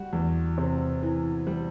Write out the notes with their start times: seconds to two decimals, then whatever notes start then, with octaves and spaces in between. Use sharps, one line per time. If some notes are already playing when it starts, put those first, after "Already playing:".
Already playing: G3 F#4
0.13 E2
0.58 C3
1.03 E3
1.47 G3